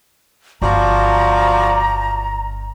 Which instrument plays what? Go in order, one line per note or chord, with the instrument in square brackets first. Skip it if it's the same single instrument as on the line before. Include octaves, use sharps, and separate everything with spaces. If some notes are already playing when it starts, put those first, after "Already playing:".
[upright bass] G1 [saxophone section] F3 F#4 D5 [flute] A#5